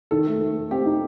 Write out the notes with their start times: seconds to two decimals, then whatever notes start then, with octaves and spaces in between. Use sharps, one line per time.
0.11 D#3 A4
0.26 A3
0.41 A3
0.56 A3
0.71 C4 G4
0.86 D#4